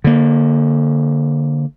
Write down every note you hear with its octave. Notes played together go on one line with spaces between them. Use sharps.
D3 A#3